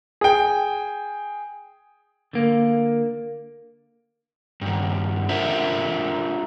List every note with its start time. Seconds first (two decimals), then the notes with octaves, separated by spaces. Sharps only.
0.21 G#4 G5
2.33 D3 A#3
4.61 G2 D#3
5.29 D4 F4 A4 A#4 C5 E5